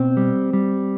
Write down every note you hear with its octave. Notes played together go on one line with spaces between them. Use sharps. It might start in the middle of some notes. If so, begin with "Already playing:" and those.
Already playing: B2 C4
G3
G3